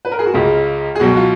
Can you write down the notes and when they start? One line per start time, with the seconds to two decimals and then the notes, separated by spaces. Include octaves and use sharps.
0.05 B4
0.12 A#4
0.19 G#4
0.26 F#4
0.33 C#2 C#3 G#3 F4
0.95 G#4
1.00 C#2 B2 F#3 F#4
1.16 F4